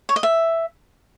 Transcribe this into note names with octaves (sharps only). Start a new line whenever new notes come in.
C#5
D#5
E5